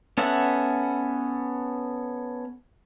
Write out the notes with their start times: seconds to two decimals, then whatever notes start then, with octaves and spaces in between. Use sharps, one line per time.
0.18 B3 C#4 A4 E5 F#5